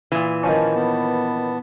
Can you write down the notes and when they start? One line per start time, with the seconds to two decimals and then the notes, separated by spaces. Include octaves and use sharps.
0.12 A#2 E3
0.43 D#3 F3 C#4 G#5 A5
0.74 B3 A5